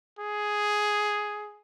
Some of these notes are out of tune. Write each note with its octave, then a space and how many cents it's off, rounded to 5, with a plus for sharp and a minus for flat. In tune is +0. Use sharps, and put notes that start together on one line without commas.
G#4 +5